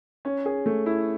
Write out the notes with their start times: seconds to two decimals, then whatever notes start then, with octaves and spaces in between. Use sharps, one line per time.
0.25 C#4
0.46 G#4
0.66 A3
0.86 E4